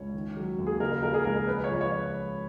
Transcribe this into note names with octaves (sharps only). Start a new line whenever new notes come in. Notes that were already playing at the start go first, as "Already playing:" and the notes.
Already playing: C#2 C#5
D#3
F#3
D#2
G#4
C#3 A#4
F3 A#4
G#4
C#2 A#4
C#3 B4
C#5
F3
C#5